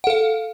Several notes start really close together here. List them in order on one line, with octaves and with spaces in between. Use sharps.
F#5 A4 F5